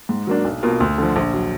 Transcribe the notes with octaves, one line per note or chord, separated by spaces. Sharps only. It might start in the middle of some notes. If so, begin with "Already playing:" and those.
G#2
F#3 A#3 D4
B1
B2 A#3 F4 A#4
D2
D3 F3
A#1
F#3